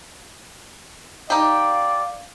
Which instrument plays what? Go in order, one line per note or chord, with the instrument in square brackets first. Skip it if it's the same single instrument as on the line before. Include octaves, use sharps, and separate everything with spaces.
[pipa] D#4 G4 [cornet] D5 [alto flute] F5